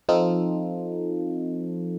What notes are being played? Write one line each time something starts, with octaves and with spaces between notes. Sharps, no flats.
F3 C4 D#4 F4 A4